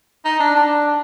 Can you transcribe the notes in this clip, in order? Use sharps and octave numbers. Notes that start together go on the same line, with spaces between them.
D#4
D4
D4